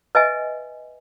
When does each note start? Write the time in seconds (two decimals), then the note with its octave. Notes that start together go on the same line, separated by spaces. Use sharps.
0.15 B4 D#5 E5 G#5